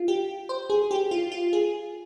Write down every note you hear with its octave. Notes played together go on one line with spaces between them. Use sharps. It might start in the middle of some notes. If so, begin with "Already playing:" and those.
Already playing: F4
G4
C5
G#4
G4
F4
F4
G#4